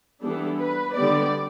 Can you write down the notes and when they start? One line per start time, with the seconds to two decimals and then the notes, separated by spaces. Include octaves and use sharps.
0.23 E3 G3 B3 D4 A4
0.60 B4
0.96 D3 G3 B3 D5